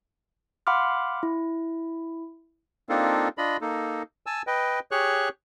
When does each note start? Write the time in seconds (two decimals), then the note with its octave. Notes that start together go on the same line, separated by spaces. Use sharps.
0.67 F5 F#5 B5 C6 D6 F6
1.23 E4
2.89 A#3 C4 D4 D#4 F4 A4
3.38 D4 F4 D#5 B5
3.61 A#3 D#4 A4
4.26 G#5 A5 E6
4.47 B4 D#5 G5
4.91 G4 G#4 C#5 C#6 F#6